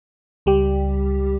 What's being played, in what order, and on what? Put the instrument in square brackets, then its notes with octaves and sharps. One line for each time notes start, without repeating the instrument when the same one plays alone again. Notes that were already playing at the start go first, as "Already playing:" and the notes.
[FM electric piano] C#2 G3 G4